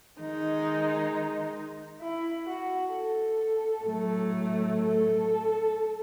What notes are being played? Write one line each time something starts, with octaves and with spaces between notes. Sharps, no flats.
D#3 G#3 D#4
E4
F#4
A4
A2 F#3 A3
A4